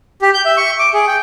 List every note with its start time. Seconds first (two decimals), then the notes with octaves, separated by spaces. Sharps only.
0.22 G4
0.34 G6
0.45 E5
0.57 C#6
0.79 D6
0.94 G#4
1.07 G5